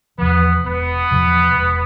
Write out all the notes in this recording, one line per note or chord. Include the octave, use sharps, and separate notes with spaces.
E2 C3 F3 B3
E1 B3
E2 C3 F3
E1